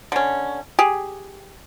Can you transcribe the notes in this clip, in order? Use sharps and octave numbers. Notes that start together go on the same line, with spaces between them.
D3 C#4
G4 G#4